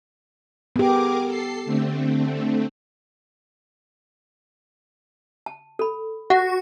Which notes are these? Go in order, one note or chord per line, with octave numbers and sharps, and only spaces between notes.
B3 G4 G#4 A#4 D6
A4 C7
D3 A3 C4
A5
A4 B5
F#4 F#5